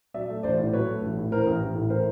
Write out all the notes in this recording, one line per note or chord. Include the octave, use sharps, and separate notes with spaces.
F#3 D5 E5
A3
A1 C5 D5
A2
F#3 B4 C#5
A3
A1
A2
E3 A#4 C5
A1
A1
A2
E3 A#4 C5